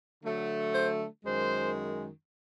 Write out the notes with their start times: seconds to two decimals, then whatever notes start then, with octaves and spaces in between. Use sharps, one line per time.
0.23 D3 F#3 A3
0.74 C5
1.25 F#2 D#3 G#3 C5